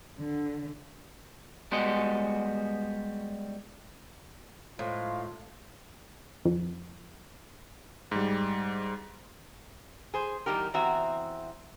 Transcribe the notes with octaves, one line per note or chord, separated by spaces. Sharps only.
D3
G3 G#3 B3 F#4 D#5
A2 F3 G#3 F4 F5
F2
G#2 G3
G#4 C5
E2 G3 D#4 G4 A#4
E2 C4 F#4 E5 A#5